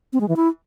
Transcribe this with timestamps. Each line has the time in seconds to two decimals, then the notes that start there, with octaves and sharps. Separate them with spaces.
0.13 C4
0.21 G#3
0.28 E3
0.36 E4